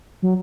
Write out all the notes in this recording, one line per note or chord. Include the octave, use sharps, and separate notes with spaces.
F#3